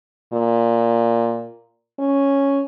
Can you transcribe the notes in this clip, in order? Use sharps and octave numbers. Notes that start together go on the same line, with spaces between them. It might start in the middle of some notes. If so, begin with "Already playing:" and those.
A#2
C#4